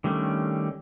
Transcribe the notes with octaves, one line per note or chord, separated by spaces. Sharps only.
D3 D#3 G3 A3 C#4